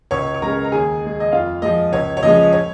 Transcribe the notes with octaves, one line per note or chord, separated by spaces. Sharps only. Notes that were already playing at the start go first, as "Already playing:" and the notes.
C#2 C#5 C#6
C#6
C#3 G#3 A#4 A#5
A#5
D#2 G#4 G#5
D#3 G#3
D#5
F2 F4 F5
F3 G#3 D#5
C#2 C#5
C#5
C#3 F3 G#3 D#5
C#5